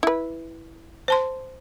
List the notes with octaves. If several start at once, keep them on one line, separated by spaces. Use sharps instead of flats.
E4 B4
C5 A5 C6